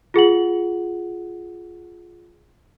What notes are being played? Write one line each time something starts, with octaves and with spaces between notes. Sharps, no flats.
F4 G#4 F#5 F#7